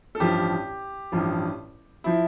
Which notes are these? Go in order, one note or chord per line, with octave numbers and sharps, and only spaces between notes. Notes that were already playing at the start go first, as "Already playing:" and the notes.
A4
A1 G2 F3 G4
A1 G2 F3
F3 E4